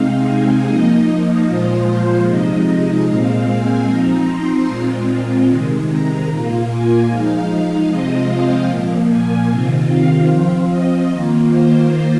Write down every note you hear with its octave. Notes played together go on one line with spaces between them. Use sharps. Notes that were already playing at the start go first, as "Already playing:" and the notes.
Already playing: C3 G#3 C4 D#4 F5
G#5
F3 A#3 D#4 D#5
A#2 F3 G#3 F4 C5
C3 F3 G#3 D#4 D#5
A#2 G#3 C4 F5
G#5
F3 C4 D#4 A#5
C6
A#2 G#3 C4 F4
C3 D#3 G#3
A#5
A#2 A#3 F4
G#5
F3 G#3 D#4 F5
C3 F3 G#3 C4 F4 D#5
F5
A#2 F3 A#3
G#5
C3 D#3 C4 F4
F5
F3 C4 F4
D#5
D#3 A#3 F4
C5